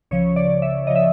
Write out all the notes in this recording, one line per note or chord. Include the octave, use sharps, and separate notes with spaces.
C#2 C#3 F3 C#5
D5
E5
C#2 C#3 F3 D#5
E5